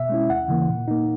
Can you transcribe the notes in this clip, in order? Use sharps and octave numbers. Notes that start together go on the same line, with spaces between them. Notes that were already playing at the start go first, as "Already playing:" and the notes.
Already playing: B2 E5
G#3 C#4 E4
D#2 F#5
C#3 E3 A#3
A#2
A#3 D#4